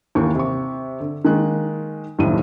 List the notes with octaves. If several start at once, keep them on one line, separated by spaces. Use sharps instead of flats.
D#2 E3 A#3 G5 C#6
C3 C#6
D3
D#3 G#3 A#3 F#6
F#1 D#2 A2 G3 D#4 D#7